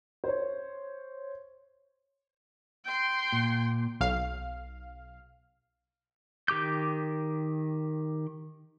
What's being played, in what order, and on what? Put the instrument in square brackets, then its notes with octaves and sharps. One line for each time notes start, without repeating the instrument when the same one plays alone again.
[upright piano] C5 C#5
[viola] G5 C6
[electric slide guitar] A#2
[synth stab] B1 F5
[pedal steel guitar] D#3 G4 D6 G6